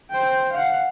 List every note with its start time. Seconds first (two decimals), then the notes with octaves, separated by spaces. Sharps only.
0.11 C5 G5
0.53 F5 F#5